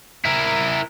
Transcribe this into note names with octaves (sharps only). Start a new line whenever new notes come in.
E4 A#4